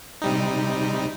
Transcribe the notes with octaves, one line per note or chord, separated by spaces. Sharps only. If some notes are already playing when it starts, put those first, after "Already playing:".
C3 G3 D#4